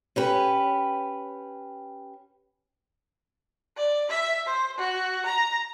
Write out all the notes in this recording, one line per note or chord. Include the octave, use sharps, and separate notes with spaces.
C#4 G4 B4
D5
E5
C5
F#4
A#5